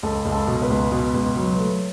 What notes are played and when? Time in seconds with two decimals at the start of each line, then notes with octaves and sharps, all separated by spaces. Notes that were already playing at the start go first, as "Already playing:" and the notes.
0.03 C#2 A4
0.25 C#2
0.32 A4
0.47 B2
0.62 B4
0.70 C#2
0.92 B2
1.14 C#2
1.36 F#3
1.58 A3